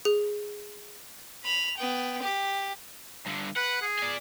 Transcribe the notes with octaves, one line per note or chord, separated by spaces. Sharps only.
G#4
B5 F7
B3 G5
G4
G2 D3
B4 F#5
G#4
D5 G#5